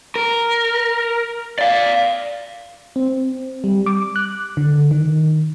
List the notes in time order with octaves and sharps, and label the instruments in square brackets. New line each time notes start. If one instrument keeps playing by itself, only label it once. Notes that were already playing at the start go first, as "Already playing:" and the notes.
[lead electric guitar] A#4
D5 F5
[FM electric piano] C4
G3
D6
F#6
D3
D#3